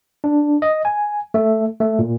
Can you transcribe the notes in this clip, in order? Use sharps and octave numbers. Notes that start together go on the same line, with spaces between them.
D4
D#5
G#5
A3
A3
A#2